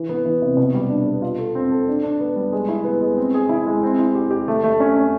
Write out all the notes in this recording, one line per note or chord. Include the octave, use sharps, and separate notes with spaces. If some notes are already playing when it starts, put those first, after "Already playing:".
Already playing: E3
B3
E3
C3
B2
G3
D4
B3
F4
A4
C4
A4
D4
D4
B3
G3
G#3
E4
B3
G#3
C4
G#4
E4
G#3
C4
E4
G4
G4
A3
A3
C#4
C#4